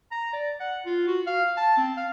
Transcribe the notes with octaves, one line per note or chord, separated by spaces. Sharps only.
A#5
D5
F#5
F4
F#4
F5
A5
C4
F5